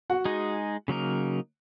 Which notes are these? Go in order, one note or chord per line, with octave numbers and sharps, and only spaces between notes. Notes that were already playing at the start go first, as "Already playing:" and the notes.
F#4 F#5
G#3 D#4 G#4
C#3 F#3 A#3 D#4 A#4